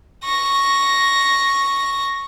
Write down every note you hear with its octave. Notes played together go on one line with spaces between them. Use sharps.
C#6 A#6